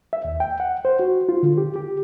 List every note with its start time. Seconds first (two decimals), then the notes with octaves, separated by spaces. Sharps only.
0.13 E5
0.25 D#2
0.40 G5
0.60 F#5
0.85 C5
0.99 F#4
1.29 F4
1.43 D3
1.57 G4
1.76 G4